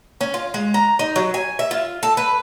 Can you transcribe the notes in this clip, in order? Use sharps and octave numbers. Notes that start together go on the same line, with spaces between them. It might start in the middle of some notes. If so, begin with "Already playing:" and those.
C#4
F4
G#3
A#5
D#4
F#3
G#5
E5
F4
A4
B4